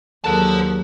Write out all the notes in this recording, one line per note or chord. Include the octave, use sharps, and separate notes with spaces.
D#2 D3 F#3 G#4 A#4 C5 A5 F#6